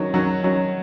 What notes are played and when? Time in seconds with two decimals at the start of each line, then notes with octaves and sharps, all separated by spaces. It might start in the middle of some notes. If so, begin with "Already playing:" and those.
Already playing: D#3 F#3 C#4
0.14 D#3 F#3 C#4
0.43 D#3 F#3 C#4